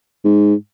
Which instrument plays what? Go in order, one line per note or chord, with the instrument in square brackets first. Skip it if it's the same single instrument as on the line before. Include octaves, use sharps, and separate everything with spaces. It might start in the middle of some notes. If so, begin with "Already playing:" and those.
[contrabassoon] G#2